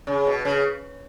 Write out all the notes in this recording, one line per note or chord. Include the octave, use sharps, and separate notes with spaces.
C#3
B2
C#3